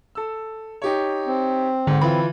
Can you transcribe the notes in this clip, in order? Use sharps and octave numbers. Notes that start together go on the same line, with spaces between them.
A4 E6
D#4 G4 C#5
C4
G#2 D3
E3 F4 B5